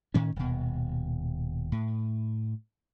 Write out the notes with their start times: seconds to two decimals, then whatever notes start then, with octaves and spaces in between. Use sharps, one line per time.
0.14 A2 D#3 C#4
0.36 D#1 B2
1.72 A2